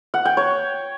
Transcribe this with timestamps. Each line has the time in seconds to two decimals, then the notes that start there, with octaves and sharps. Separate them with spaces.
0.14 F#5
0.25 G5
0.37 C#5